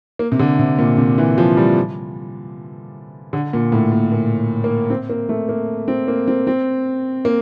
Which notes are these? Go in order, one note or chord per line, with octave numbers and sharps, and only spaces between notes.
A#3
C3
D3
C3
A#2
C3
E3
F3
G3
D3
A#2
A2
A#2
A#2
A#3
C4
A#3
A3
A#3
C4
A#3
C4
C4
A#3